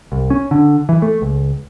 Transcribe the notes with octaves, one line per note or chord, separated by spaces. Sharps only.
C2
C#4
D3
E3
A3
C#2